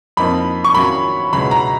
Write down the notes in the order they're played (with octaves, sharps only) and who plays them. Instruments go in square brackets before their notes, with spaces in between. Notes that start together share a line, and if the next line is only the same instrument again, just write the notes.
[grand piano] F2 F3 A#3 D#4 [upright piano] B5
[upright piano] C#6
[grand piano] D#3 F#3 C#4 F4 [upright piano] B5
[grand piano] C#2 B2 F#3 C#4 G#4 [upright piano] B5
[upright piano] A#5